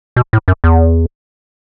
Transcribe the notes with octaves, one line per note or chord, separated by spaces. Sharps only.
B2
A2
F#2
E2